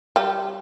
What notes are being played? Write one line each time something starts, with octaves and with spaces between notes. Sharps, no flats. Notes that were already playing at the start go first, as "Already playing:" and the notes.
G3 G4